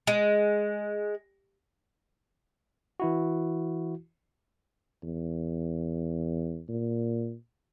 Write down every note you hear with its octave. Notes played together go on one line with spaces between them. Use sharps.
G#3
E3 E4 F#4
E2
A#2